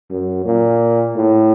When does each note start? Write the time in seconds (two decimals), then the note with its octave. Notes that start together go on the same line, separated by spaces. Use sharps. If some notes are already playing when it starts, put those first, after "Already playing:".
0.11 F#2
0.46 A#2
1.16 A2